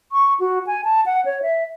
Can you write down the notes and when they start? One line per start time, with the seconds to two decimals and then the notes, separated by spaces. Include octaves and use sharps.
0.12 C#6
0.40 F#4
0.67 G#5
0.84 A5
1.06 F#5
1.25 C#5
1.42 E5